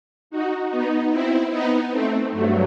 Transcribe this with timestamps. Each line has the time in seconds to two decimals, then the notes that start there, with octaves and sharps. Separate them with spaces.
0.30 D#4 F#4
0.71 B3 D#4
1.11 C4 E4
1.51 B3 D#4
1.91 A3 C4
2.32 G2 F#3 A3